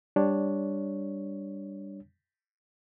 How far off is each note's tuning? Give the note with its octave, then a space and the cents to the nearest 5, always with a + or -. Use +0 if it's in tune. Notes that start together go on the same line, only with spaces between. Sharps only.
G3 +10 D4 +0 C#5 +0